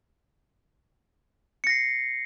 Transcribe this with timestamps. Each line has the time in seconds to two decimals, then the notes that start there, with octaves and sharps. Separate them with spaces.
1.64 C#7
1.67 A#6
1.70 C7